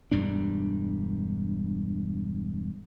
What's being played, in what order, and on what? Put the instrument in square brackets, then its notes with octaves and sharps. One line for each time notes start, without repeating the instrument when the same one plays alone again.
[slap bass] E1 G2 G3 D4